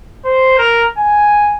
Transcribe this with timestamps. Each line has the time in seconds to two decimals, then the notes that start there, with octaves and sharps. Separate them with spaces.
0.25 C5
0.58 A#4
0.97 G#5